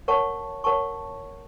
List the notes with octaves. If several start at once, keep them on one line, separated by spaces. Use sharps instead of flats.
A#4 C#5 F#5 A5 C#6
A#4 C#5 F#5 A5 C#6